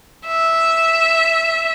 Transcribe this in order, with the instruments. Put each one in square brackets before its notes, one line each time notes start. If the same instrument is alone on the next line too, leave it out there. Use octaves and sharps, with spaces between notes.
[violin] E5